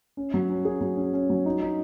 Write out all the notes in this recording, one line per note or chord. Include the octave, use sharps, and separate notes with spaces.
C#4
F#3
C#4
G#4
F#3
C#4
C#4
F#3
D#4
D#4